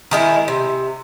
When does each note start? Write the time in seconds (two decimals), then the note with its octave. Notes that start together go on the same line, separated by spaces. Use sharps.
0.11 D#3 G#3 E4
0.48 C3